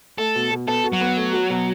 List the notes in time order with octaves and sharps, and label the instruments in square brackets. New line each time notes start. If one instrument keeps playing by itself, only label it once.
[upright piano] A3 [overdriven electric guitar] A4
[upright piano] B2
B2
[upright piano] B3 [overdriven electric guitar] A4
[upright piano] F#4
[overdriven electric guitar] F#3
[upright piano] B3
A3
F#4
B2